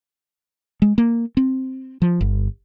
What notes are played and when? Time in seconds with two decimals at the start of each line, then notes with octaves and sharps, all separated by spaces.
0.82 G#3
0.98 A#3
1.37 C4
2.02 F3
2.21 G1